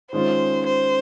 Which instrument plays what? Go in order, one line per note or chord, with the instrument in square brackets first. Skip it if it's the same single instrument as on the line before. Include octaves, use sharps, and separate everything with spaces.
[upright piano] D#3 G#3 C#4 F4 [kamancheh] C5
[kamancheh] C5